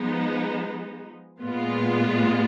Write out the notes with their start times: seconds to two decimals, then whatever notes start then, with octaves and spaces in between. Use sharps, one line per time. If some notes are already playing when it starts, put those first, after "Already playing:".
Already playing: F3 G#3 B3 D#4
1.42 A#2 G#3 B3 F4